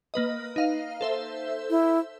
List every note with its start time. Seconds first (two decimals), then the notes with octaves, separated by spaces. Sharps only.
0.14 A#3 B4 D#5
0.56 D#4 F5
1.01 A4 C5 E5
1.70 E4